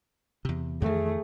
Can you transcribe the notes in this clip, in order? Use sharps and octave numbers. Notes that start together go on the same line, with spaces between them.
E2 C3
F2 D#3 E3 A3 G#4